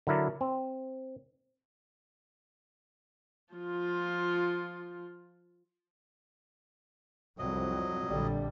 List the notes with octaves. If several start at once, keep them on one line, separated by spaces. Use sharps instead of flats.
D3 F#3 E4 A#4 D5
C4
F3 F4
C2 F2 F#3 D#5
A#1 D3 G3